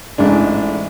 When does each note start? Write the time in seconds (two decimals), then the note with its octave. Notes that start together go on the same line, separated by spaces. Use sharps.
0.18 A1 G#2 D4